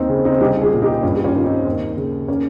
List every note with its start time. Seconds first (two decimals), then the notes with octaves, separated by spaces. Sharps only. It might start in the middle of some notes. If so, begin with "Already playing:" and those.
Already playing: D#2 C4 D#4
0.09 C#3
0.25 C4 D#4
0.40 C2 D#4 G4
0.62 F4 G#4
0.72 A#2
0.82 D#4 G4
1.03 G2 C#4 F4
1.15 G4
1.24 C#4 F4
1.34 D#3
1.45 C4 D#4
1.65 D#2
1.97 C#3
2.28 A#3 C#4